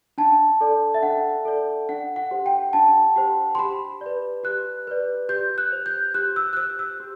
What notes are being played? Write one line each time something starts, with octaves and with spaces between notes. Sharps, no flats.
D4 A5
A4 D5
E5
D4 F#5
A4 D5
D4 F#5
F#5
G4 C5
G5
D4 A5
G4 C5
C6
G4 B5
B4 D5
G4 F#6
B4 D5
G4 G6
F#6
C5
G6
G4 F#6
E6
F#6
C5 E6
E6
G4